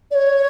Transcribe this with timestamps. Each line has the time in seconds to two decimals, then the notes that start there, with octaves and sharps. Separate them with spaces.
0.11 D5
0.15 C#5